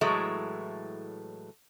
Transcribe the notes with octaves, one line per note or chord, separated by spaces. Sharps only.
A2 E3 F#3 G#3 A3